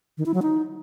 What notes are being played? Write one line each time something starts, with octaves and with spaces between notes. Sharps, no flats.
D#3
E4
F#3
D#4